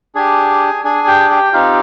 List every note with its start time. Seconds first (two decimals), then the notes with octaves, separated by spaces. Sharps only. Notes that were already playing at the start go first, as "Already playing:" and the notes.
0.15 D4 G4 G#4 G#5
0.84 D4 G#4 G#5
1.07 G4 G5
1.20 G#5
1.30 G4 G5
1.53 C4 D#4 F4 G4 F5